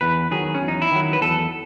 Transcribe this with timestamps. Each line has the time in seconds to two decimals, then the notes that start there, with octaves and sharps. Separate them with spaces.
0.01 E2 B4
0.31 D#3 F#3 G#4
0.55 C#4
0.62 E2
0.68 D#4
0.82 E4
0.92 D#3 F#3
1.13 B4
1.21 E2 A4